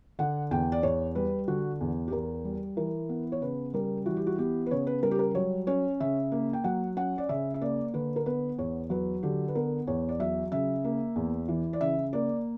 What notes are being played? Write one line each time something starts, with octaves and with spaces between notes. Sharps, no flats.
D3 F#5
E2 G5
D5
E2 C#5
G3 B4
D3 F#4
E2
G4
E2 A#4
G3
E3 A#4
B3
C#5
C#3 B4
G3 A#4
E3 F#4
G4
F#4
B3 G4
B4
C#3 C#5
B4
G3 A#4
G4
A#4
F#3 C#5
C#4 C#5
C#3 E5
A#3
G5
F#3 F#5
C#4 F#5
D5
C#3 E5
E5
A#3 D5
D3 B4
A#4
B3 B4
E2 C#5
F#3 B4
D3 G4
B4
B3 A#4
E2 C#5
D5
F#3 E5
C#3 E5
A#3
E2
E3
D5
C#3 E5
A#3 D5